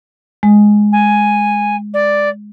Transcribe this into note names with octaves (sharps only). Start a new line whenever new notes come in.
G#3
G#5
D5